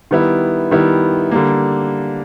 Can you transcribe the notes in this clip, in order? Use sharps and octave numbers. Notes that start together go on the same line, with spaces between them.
D#3 G3 B3 E4
D#3 G3 B3 E4
D3 G3 A#3